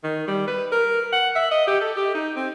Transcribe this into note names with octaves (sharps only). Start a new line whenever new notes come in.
D#3
G3
B4
A#4
F#5
E5
D#5
G4
A4
G4
D#4
C4